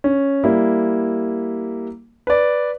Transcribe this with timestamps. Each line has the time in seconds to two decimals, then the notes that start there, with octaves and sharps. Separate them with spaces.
0.04 C#4
0.44 G3 A#3 E4
2.27 B4 D5